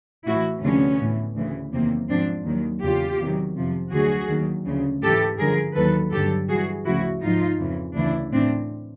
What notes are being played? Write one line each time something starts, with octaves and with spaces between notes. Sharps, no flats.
A2 E3 E4 F#4
D2 C3 F3 B3 C#4
A2 E3
D2 C#3 E3
E2 C3 D#3 F#3 A#3 C4
G#2 F3 C4 D4
D#2 D#3 F#3
E2 C#3 F#3 F4 G4
E2 C3 D#3 F#3
F2 C3 F3
D2 D3 F#3 F#4 G#4
D#2 D#3 F#3
D2 C#3 F3
G#2 E3 G4 A4
G2 D3 F3 G#4 A#4
D#2 D#3 F#3 A4 B4
G2 D3 F#3 G4 A4
G2 E3 F#4 G#4
D2 C#3 F3 E4 F#4
G#2 F3 D#4 F4
F2 C#3 E3
D2 C#3 E3 D4 E4
A2 E3 C4 D4